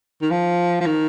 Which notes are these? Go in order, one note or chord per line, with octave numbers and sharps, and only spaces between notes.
D#3
F3
F3
D#3